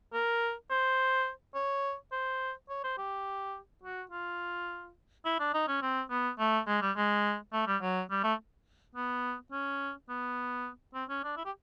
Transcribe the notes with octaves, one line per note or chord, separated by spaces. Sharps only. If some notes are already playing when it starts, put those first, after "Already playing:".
A#4
C5
C#5
C5
C#5
C5
G4
F#4
F4
E4
D4
D#4
C#4
C4
B3
A3
G#3
G3
G#3
A3
G3
F#3
G3
A3
B3
C#4
B3
C4
C#4
D4
E4
G4